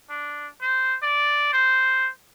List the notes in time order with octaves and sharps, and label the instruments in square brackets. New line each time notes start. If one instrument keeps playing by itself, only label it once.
[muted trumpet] D4
C5
D5
C5